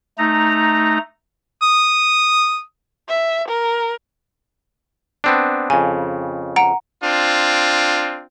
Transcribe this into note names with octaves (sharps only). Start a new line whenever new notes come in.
A3 D#4 A#5
D#6
E5
A#4
B3 C4 D4
F2 C#3 G#5
F#5 A#5 D7
C4 D4 F4